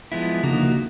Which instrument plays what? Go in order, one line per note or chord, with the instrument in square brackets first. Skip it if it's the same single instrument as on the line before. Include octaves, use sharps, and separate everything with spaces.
[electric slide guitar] F3 G#3 B3 E4
[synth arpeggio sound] C#3 [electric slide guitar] F3 A#3 D#4 F#4
[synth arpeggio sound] D3
C#3
D3